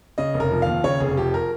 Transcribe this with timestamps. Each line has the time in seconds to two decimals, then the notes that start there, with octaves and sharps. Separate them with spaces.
0.18 C#3 D#5
0.34 F1
0.40 A#4
0.51 F3
0.62 D#2 F5
0.84 C#3 C#5
1.00 F1 G#4
1.17 F3 G4
1.34 A#4